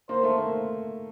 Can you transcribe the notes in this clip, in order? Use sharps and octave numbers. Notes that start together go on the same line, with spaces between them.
A#3 C5
A3
A#3